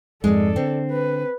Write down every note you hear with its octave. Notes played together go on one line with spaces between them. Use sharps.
F2 G#2 G#3 A4 D5
D3 C4
B4